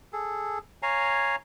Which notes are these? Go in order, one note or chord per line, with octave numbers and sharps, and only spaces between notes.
G#4 A4
C#5 F5 G#5 A#5